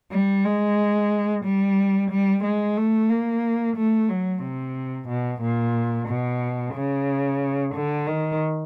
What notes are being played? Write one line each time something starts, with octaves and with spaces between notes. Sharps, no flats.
G3
G#3
G3
G3
G#3
A3
A#3
A3
F#3
C3
B2
A#2
B2
C#3
D3
D#3